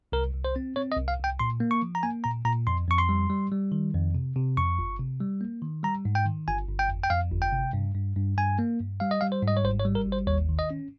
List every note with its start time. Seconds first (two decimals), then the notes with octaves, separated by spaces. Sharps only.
0.12 C2 A#4
0.33 C2
0.45 C5
0.56 C4
0.76 C4 C#5
0.92 D#5
0.97 C2
1.08 F5
1.19 C2
1.24 G5
1.39 A#2 C6
1.60 A#3
1.71 C#6
1.82 F3
1.95 A#5
2.03 A#3 G#5
2.24 A#2 A#5
2.45 A#2 A#5
2.67 F2 C6
2.88 F2 C#6
2.98 C6
3.09 G3
3.30 G3
3.52 G3
3.72 D#3
3.94 F2
4.15 C3
4.36 C3
4.57 F2 C#6
4.79 G1
5.00 C3
5.21 G3
5.41 A#3
5.62 D#3
5.83 G3 A#5
6.05 G#2
6.15 G5
6.25 D#3
6.48 G1 G#5
6.68 G1
6.79 G5
6.89 F2
7.04 G5
7.10 F2 F5
7.31 G1
7.42 G5
7.52 C3
7.73 G2
7.95 G2
8.16 G2
8.38 G2 G#5
8.59 A#3
8.80 G2
9.00 G3 F5
9.11 D#5
9.21 G3 F5
9.32 C5
9.42 G#2
9.48 D#5
9.57 C#5
9.64 G#1 C5
9.80 C#5
9.85 G3
9.95 A#4
10.07 G#1
10.12 C5
10.27 D#2 C#5
10.49 D#3
10.59 D#5
10.70 C#4